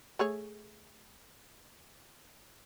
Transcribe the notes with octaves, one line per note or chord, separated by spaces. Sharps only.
A3 G#4 C#5